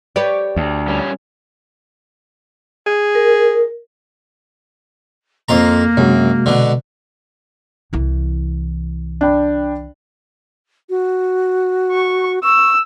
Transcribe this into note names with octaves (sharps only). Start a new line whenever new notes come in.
G4 B4 C#5 D5
D2
G3 C#4
G#4
A#4
F2 A#3 F4 A#5
F#2 C3 G#3 F#4
B2 D3
C2 E3
D4 G5 B5
F#4
C#6
C#6 E6